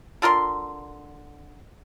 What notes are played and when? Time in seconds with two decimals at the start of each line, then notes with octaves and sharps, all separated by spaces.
0.22 D3 F4 A#4 C6